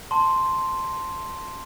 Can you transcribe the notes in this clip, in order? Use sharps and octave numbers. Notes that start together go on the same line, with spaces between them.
A5 C6